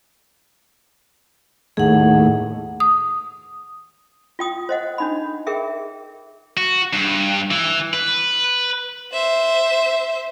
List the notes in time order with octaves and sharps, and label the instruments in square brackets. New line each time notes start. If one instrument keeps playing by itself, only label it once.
[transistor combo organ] D#2 A2 [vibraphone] G#4 F#5
[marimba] D#6
[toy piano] F4 G5 D#6
C5 D#5 F#5
D4 D#4 B5
G#4 A#4 E5 G5
[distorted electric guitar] F#4
G2
E3
B4
[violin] C5 E5